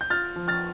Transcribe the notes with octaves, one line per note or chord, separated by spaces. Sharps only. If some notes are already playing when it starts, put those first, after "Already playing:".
G6
F4 F6 A6
F3
F6 A6